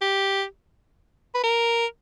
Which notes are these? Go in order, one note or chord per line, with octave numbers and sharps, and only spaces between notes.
G4
B4
A#4